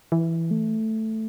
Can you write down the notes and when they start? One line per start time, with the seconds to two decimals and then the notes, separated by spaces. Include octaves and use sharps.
0.12 E3
0.51 A3